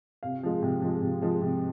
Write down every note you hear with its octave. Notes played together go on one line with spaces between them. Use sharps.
C3 F5
F3 G#3
C3
F3 G#3
C3
F3 G#3
C3